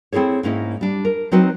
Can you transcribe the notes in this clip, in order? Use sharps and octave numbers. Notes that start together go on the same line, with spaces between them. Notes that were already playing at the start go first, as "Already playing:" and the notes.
C4 E4 G#4 A4 C#5
G#2 A#3 C#4 E4 D#5
G3 D4
A#4
F#3 C4 D#4 F#4 B4 D#5